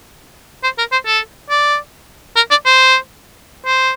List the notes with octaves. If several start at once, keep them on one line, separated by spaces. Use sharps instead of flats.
C5
A#4
C5
A4
D5
A#4
D5
C5
C5